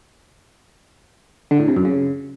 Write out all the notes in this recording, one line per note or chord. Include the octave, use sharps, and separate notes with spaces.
D3
A2
C3
F#2
C#3